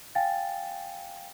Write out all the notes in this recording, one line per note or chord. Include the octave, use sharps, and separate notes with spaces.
F5 G5 G#5 A6